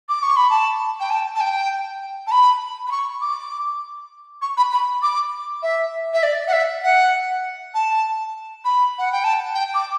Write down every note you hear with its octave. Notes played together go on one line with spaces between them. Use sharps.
D6
C#6
B5
A5
G5
A5
A5
G5
A5
B5
B5
C#6
D6
C#6
B5
B5
D6
E5
E5
D5
F#5
E5
F#5
A5
B5
F#5
G5
A5
G5
D6